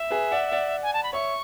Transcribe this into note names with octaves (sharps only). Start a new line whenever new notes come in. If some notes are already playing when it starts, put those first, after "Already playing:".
Already playing: E5
G#4 B4
D5 F#5
D5 F#5
G#5
A5
B5
C#5 E5 C#6